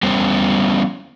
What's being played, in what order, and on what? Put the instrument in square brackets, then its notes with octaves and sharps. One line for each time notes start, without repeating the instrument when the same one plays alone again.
[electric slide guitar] G3 B3 C#4 C5